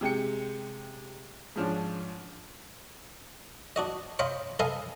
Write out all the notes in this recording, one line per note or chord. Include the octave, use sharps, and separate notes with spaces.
C3 G#3 G5 C#7
G#2 F3 C#4 D4
D4 F#4 D#5
C#5 D#5 F5 G5 B5 C6
A4 B4 D#5 F5 G#5